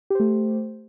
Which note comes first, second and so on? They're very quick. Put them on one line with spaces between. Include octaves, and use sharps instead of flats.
G4 C5 A3